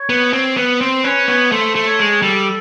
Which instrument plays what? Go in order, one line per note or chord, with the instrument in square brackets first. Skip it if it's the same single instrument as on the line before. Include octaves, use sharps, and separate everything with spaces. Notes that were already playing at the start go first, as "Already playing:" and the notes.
Already playing: [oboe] C#5
[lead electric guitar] B3
C4
B3
[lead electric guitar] C4 [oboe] C5
[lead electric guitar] C#4 [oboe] B4
[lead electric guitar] B3 [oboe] C#5
[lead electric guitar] A3 [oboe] C5
[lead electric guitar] A3
[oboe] C#5
[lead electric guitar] G#3
[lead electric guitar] G3 [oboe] A4